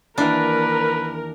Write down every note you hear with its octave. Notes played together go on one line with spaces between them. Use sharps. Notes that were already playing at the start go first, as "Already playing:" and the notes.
D#2 E3 A#3 D4 A#4 B4